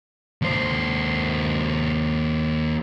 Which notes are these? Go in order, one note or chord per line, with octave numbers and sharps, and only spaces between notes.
D#2 C5